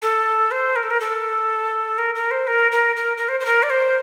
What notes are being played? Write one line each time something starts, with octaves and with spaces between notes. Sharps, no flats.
A4
C5
A#4
A4
A#4
A4
A#4
A#4
C5
A#4
A#4
A#4
A#4
C5
C5
A#4
D5
C5